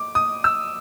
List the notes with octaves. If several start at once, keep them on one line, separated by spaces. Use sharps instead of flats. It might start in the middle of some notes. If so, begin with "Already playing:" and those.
Already playing: D6
D#6
E6